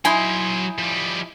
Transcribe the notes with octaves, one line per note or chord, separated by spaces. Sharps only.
F#3 D#4 E4 G#5 C6
F3 G3